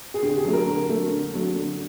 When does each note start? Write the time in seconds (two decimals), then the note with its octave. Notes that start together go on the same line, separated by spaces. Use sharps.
0.14 G#4
0.23 D3 G4
0.38 G#4
0.45 F#3 A3
0.53 A#4
0.68 D3
0.89 F#3 A3
1.11 D3
1.34 F#3 A3
1.56 D3